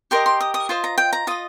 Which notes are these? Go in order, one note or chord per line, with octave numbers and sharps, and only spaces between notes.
G4 A#4 D#5 C6
C6
D#6
D#6
F4 C5 D#5 C6
A#5
G5
A#5
F4 D#5 D#6